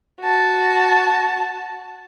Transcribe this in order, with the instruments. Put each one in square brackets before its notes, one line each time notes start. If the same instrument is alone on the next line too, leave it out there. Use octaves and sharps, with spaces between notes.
[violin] F#4 A5